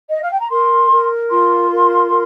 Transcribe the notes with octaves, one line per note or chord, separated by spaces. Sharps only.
D#5
F5
G5
A#5
A#4 C6
A#4
F4 C6
A#4
A#4